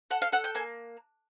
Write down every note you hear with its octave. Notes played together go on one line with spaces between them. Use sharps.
A4 F#5
F5
A4 F#5
G5
A#3 G#5